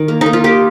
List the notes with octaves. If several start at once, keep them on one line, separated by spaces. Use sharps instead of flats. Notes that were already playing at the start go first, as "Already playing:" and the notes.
Already playing: D#3
A#3
A#3 D#4
F4
A#3 G4